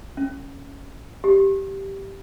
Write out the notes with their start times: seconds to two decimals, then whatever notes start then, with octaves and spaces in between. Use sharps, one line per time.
0.17 C#4
1.24 G4